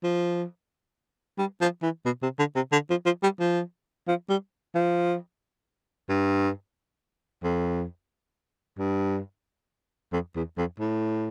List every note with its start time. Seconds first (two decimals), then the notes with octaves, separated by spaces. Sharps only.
0.03 F3
1.38 G3
1.61 F3
1.82 E3
2.06 B2
2.23 C3
2.39 D3
2.55 C3
2.72 D3
2.90 F3
3.06 F3
3.23 G3
3.40 F3
4.08 F3
4.29 G3
4.75 F3
6.09 G2
7.43 F2
8.78 G2
10.12 F2
10.36 E2
10.58 F2
10.80 A2